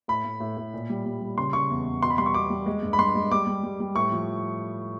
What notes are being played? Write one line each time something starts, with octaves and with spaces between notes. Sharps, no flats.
A2 B5
A2
A2
A2
A#2
G3
G3
G3
C#3 C6
C#3 C#6
E2
E2
B2 C6
B5
G3 C6
C#6
B2 D6
G3
G#3
G2
B5
G2 C6
G#3
G3 D6
G3
G3
G3
A2 C#6
F3